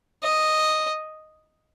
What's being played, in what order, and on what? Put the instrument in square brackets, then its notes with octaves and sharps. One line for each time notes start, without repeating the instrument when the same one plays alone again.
[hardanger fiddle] D#5